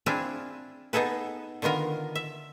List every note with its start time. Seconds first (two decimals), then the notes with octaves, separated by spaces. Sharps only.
0.06 C4 D4 E4 F4 G#4
0.93 B3 D#4 G#4 A4 B4
1.62 D3 D#3 B3 F4 A#4
2.15 E5